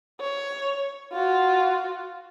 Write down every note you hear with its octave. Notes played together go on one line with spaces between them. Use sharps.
C#5
F4 F#4